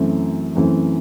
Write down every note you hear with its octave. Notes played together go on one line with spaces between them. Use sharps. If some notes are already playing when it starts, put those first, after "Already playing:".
Already playing: F#2 E3 A3 C4
F#2 E3 A3 C4